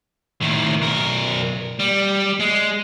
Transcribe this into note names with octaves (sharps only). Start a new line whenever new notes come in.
A2 D#3
B1 A#4
G3
G#3